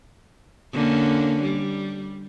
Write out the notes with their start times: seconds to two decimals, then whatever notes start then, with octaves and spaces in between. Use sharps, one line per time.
0.73 D3 A#3 C#4
1.42 G3